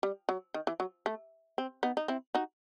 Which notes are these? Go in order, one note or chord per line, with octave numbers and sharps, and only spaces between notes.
G3
F#3
D#3
E3
F#3
A3
C4
B3 D#4
D#4
C4 E4
D#4 F#4